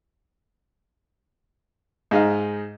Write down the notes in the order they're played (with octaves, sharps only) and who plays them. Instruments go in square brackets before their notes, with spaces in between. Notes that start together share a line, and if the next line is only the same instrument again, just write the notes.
[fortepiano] G#2 D#4 F5